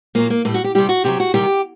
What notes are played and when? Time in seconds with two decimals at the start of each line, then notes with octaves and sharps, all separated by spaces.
0.15 A#2 F#3 A#3
0.30 A#3
0.45 A2 G3 A#3
0.54 F#4
0.64 G4
0.75 C3 G3 G4
0.89 F#4
1.04 C3 D#3 F#3 G4
1.20 F#4
1.34 C3 D#3 G3 G4